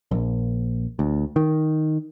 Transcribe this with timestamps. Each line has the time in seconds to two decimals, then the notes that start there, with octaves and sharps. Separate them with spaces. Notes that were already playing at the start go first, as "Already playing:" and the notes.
0.11 A#1
0.99 D2
1.36 D#3